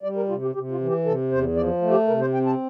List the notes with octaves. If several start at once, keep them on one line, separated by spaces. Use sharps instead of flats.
G3 D5
A#4
C3 F4
G4
C3 G4
F4
E3
G4
C3 A4
E2 C5
F3 D5
A3
G4
C3 A#4
C5
C4 G5
A5